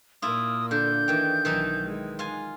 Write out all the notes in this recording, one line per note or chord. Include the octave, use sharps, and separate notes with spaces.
A#2 A#3 E4 F4 D#6
D3 G6
D#3 E3 G5
B1 D#3 E3 D#4
G#3
F4 G#5